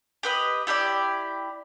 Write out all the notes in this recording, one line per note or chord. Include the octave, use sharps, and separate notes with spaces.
G4 B4 D#5
E4 G4 A4 D5